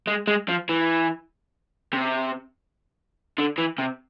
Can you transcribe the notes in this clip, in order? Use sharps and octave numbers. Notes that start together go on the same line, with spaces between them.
G#3
G#3
F3
E3
C3
D3
E3
C3